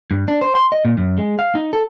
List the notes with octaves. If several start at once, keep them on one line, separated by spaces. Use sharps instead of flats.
G2
D4
C5
C6
D#5
A#2
F#2
G#3
F5
D#4
A4